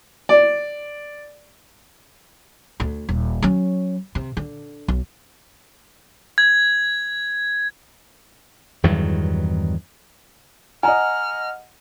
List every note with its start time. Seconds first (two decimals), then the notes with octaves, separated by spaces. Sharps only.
0.29 D5
2.80 D2 D3
3.09 D#1
3.42 F#3 C#4
4.15 C3
4.37 D3
4.88 B1
6.38 G#6
8.84 E2 G2 D#3 F#3
10.83 D#5 F#5 G#5 A#5 F6